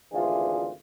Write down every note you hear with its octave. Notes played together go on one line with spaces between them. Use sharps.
G#1 D2 E3 D4 F4 G#4